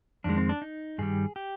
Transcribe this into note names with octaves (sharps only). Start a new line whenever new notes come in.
F2 D#3 G#3 D4
C4
D4
D#4
G2 D#3 G3 G#4
G4